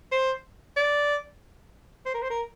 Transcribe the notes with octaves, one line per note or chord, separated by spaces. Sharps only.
C5
D5
C5
A#4
C5
A#4